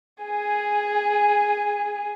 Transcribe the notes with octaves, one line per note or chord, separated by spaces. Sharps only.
G#4 G#5